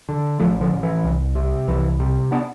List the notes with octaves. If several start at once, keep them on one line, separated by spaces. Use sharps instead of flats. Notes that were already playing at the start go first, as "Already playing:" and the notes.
D3
A1 F3 A3
D3 F3
A1
E3
C2
C3
C2 E3
C3
B3 D4